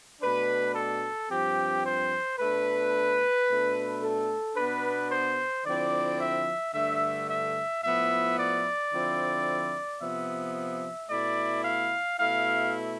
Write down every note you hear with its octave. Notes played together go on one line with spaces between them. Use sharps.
B2 A3 D4 B4
A4
G2 F3 C4 G4
C5
B2 A3 D4 B4
B2 A3 D4
A4
B2 B3 D4 B4
C5
D3 F3 C4 E4 D5
E5
G2 D3 A3 E5
E5
A2 F3 B3 E4 E5
D5
D3 F3 C4 E4
C3 F3 B3 E5
B2 A3 E4 D5
F5
B2 A3 E4 F5